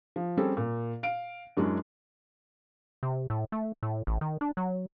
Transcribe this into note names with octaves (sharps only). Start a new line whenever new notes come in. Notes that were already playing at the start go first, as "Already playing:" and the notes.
F3
G3 C4 C#4 G#4 A4
A#2
F5 D7
F#2 F#3 G#3 C#4 D4 E4
C3
A2
A3
A2
A1
D#3
D4
F#3